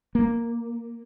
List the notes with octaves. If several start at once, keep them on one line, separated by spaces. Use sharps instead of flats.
A#3